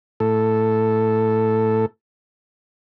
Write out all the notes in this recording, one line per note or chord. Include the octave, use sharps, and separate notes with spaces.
A2 A4